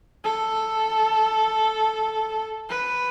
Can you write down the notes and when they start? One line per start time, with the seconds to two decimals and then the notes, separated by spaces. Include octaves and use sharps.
0.24 A4
2.70 B4